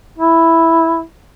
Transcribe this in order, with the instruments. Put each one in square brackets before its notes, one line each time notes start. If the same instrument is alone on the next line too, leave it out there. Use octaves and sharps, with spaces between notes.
[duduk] E4